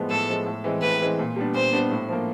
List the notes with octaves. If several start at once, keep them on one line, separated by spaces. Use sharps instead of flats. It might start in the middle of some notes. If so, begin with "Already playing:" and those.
Already playing: A2 F3 G#3 B3
A2 A4
F3 G#3 B3
A2
E3 G#3 C4
A2 B4
E3 G#3 C4
A#2
G3 B3 D4
A#2 C5
G3 B3 D4
A2
F3 A#3